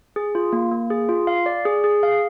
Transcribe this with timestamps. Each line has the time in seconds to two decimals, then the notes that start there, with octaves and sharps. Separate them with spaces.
0.16 G#4
0.35 F4
0.53 A#3
0.72 A#3
0.90 G#4
1.09 F4
1.27 F5
1.46 D5
1.65 G#4
1.84 G#4
2.03 F5